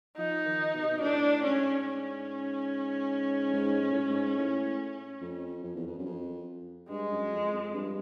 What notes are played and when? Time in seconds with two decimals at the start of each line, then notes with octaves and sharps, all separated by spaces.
0.17 F3 D#4
0.46 D#3
0.74 B2
0.82 C3
0.89 B2
1.01 A2 D4
1.44 G#2 C#4
1.85 C#4
3.53 G#2
3.82 G#2
3.91 A2
3.99 G#2
4.10 G#2
4.38 A2
5.21 F2
5.64 F2
5.76 E2
5.87 F2
5.98 F#2
6.06 F2
6.89 G2 G#3
7.11 F#2
7.32 F2
7.53 F2
7.74 G2